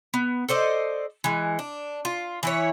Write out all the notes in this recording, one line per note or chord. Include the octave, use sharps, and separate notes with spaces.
B3
A4 C5 D5 D#5
E3 G#3
D4
F4
E3 E4 C#5